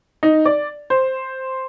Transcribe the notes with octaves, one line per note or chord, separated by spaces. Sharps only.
D#4
D5
C5